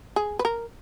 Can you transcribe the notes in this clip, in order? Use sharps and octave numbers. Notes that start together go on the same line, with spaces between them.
G#4
B4
A#4